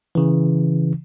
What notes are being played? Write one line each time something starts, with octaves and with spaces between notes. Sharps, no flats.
C#3 E3